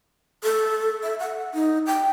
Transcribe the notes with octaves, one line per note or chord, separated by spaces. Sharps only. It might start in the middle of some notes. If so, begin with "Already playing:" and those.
A4
E5
F#5
D#4
G5